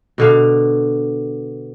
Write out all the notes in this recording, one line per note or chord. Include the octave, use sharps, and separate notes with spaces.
B2 D3 F5